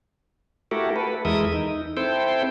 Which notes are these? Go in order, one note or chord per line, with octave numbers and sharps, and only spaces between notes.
A3 E4 F#4 G4 A4 A#4
A4 B4
E2 E3 G#3 A#4 E5 D#6
D#4
C4 E4 A4 C5 G5